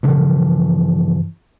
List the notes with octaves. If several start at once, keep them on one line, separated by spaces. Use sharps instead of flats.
G2 C#3 E3 F3